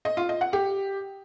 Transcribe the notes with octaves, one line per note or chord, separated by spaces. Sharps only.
D#5
F4
D#5
F#5
G4